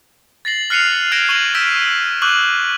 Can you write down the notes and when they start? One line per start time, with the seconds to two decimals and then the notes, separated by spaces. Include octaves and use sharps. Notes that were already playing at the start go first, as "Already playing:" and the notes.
0.45 A6 A#6 C7 F#7
0.70 F6 F#6 C7 C#7 D#7 F7
1.12 F6 G6 G#6 A#6 D7 E7
1.29 C#6 F6 D#7 E7 F#7
1.54 E6 F6 G6 B6 D7 E7
2.22 C#6 D6 E6 F#6 G6 F#7